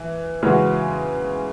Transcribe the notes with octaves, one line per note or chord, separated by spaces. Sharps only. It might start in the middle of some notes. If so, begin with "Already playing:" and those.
Already playing: E3
C#3 E3 G#3 C#4 F#4